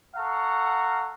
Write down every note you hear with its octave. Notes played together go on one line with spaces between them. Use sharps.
A4 F5 F#5 A#5 C#6